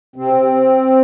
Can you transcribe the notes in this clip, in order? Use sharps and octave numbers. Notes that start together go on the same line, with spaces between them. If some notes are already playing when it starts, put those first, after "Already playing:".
C3 C4